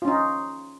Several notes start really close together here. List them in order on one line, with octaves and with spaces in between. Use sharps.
F4 C#4 D#4